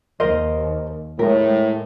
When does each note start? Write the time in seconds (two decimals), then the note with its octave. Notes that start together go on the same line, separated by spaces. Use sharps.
0.20 D#2 A#4 C5 D#5
1.19 A2 G#3 A#4